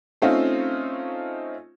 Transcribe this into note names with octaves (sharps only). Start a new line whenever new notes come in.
A3 C4 C#4 D#4 F4